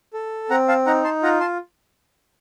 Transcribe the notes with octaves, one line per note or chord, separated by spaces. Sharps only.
A4
C4 F#5 A#5
F5 A5
D#4 F#5 A#5
A5 C6
F4 F#5 A#5
A5 C6